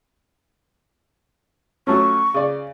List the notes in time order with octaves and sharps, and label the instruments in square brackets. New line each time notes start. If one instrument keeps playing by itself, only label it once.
[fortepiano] F#3 A3 C#4 [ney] C#6
[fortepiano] C#3 D5